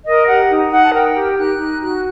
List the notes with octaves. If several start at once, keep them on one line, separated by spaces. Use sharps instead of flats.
A#4 D#5
G4 F#5
D#4
D#4 F#5
A5
A#4 G5
G4
D#4 F#6
D#4
F#4 F#6